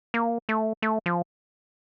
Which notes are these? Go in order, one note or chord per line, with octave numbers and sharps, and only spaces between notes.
A#3
A3
A3
F3